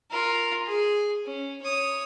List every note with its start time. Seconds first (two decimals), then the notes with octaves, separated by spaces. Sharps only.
0.11 F4 A#4
0.66 G#4
1.25 C#4
1.62 C#5 D#6